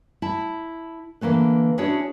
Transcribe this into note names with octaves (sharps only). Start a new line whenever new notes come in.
E4 A5
D3 E3 A#3 C#4 B4
C#4 D4 E4 F#4 G#4 C#5